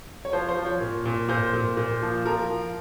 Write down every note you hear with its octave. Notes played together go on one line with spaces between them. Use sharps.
C#5
F3 C5
C5
F3
C#5
A#2
A#2
A#2 C5
A#2
A#2
F3
F3 A#4
F3